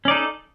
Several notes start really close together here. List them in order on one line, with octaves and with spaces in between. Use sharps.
C#4 D5 D#4 A4